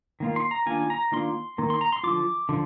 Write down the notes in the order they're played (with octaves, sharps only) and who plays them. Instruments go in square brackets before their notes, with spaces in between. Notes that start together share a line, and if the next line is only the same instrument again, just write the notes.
[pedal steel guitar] D#3 A#3 F4
C6
A#5
D#3 A#3 D4 F4 G#5
A#5
D#3 A#3 D4 F4 C6
D#3 A#3
C6
A#5
C6
D3 F3 A#3 F4 D6
D3 F3